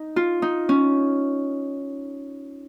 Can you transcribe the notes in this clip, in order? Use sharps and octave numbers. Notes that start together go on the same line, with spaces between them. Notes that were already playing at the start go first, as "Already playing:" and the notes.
Already playing: D#4
F4
D#4
C#4